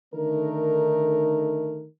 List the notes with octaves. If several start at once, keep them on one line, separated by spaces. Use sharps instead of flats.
D3 D#3 A3 D#4 A#4